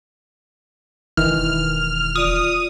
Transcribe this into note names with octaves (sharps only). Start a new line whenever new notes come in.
E1 D#3 E3 E4 F6
F4 D5 D#6